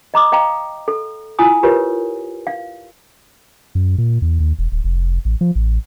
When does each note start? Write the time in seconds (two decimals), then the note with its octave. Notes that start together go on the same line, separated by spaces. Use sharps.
0.14 D#5 A#5 D6 D#6
0.32 D#5 F5 G5 A#5
0.88 A4
1.39 E4 F4 G#5 D#6
1.63 F4 G4 A#4 B4 C#5
2.47 F5
3.75 F#2
3.98 A#2
4.22 E2
4.40 D#2
4.59 E1
4.72 D1
4.84 F1
5.25 A1
5.41 F3
5.55 A1